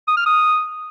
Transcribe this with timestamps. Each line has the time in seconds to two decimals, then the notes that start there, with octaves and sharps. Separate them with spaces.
0.08 D#6
0.17 F6
0.26 D#6